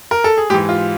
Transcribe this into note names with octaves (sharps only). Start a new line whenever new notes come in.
A#4
A4
G#4
G#2 E3 G4
F4